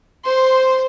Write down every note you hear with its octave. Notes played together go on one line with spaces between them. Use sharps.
C5 C6